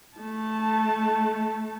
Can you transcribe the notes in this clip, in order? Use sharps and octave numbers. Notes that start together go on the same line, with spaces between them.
A3 A5